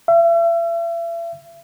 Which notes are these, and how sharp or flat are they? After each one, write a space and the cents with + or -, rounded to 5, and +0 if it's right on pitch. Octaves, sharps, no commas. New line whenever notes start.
E5 +40